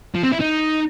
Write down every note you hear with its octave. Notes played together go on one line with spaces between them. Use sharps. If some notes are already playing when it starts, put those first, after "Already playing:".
F3
C4
E4
D#4